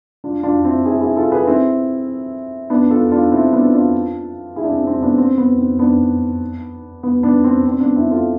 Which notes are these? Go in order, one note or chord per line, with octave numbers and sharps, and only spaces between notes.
D4 F4
D4 F4
C4 E4
E4 G#4
E4 G#4
F4 A4
G#4 B4
C4 E4
B3 D4
F4 A4
D4 F4
C4 E4
B3 D4
D4 F4
E4 G#4
D4
C4
C4
B3 D4
C4
B3
C4
B3 D4
B3
B3 D4
C4
C4
B3 D4
C4 E4
F4 A4